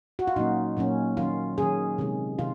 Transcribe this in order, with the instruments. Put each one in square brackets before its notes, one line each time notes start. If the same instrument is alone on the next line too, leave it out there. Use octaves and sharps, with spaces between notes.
[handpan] F#4
F4
A#2 F#3 A#3 C#4 D#4
A#2 F#3 A#3 C#4
D#3 F#3 C#4 F4
D#3 F#3 C#4 G#4
C3 D#3 G#3
C3 D#3 F4